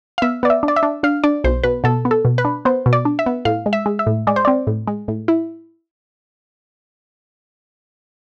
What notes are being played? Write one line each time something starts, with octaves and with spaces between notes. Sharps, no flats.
F5
B3 E5
B3 D5
E5
D4
D5
E5
D4
D4 F5
D4 D5
B1 C5
B2 B4
B2 A4
B3
A4
B2
B4
D4
B3 C5
B2
D5
D4
E5
B3
A2 F5
G#3
E5
G#3
E5
A2
G#3 D5
C5
C4 D5
A2
G#3
A2
E4